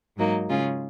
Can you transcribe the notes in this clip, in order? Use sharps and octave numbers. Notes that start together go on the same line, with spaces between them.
G#2 F#3 A#3 D#4
C#3 G#3 C#4 F4 G#4